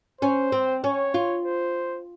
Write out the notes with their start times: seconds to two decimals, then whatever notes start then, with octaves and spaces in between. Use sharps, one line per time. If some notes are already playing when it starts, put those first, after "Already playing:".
0.21 C#4 C5
0.52 C4
0.84 C#4 C#5
1.14 F4
1.45 C5